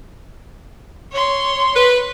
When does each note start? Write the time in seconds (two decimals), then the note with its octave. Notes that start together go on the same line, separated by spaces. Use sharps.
1.11 C#5 C6
1.75 B4